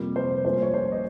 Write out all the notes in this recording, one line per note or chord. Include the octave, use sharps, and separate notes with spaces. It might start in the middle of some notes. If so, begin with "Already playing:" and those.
Already playing: F2 C3 G3 A#3 F4
C5
A#1 A#2 G3 C#4 C5
C#5
C5
D#5